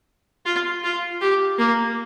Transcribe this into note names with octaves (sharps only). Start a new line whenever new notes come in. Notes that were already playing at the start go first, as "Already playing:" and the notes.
F4
F4
G4
A#3